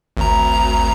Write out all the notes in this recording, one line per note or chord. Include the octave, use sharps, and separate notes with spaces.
G#1 D2 A#5